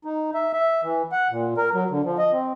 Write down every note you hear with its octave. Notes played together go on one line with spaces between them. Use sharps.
D#4
E5
E5
E3
F#5
A#2
A#4
F#3
D3
F3
D#5
C4